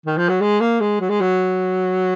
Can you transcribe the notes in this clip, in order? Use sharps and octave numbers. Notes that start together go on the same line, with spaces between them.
D#3
F3
F#3
G#3
A#3
G#3
F#3
G#3
F#3